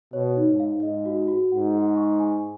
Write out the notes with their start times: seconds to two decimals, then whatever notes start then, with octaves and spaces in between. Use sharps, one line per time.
0.13 B2 C#5
0.37 D#4
0.48 G#2
0.60 F5
0.83 G#2 D#5
1.05 F#4
1.28 F#4
1.52 G#2 F#5
1.74 G#4
1.97 C#6
2.20 G#5